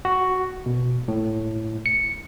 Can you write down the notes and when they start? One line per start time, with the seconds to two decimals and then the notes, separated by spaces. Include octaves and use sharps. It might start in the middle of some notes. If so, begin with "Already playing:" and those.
0.05 F#4
0.66 B2
1.08 A2
1.86 C#7